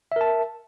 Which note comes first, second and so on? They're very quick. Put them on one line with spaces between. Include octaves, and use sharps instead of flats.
E5 A#4 A5